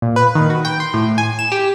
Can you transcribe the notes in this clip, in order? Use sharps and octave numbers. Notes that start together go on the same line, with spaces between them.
A#2
B4
D#3
F#4
G5
C6
A2
G#5
E7
G4